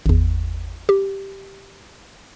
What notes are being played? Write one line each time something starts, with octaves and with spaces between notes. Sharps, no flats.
G#1 E2
G4